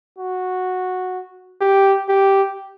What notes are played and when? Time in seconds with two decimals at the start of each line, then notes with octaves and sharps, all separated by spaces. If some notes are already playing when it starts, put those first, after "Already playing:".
0.19 F#4
1.61 G4
2.09 G4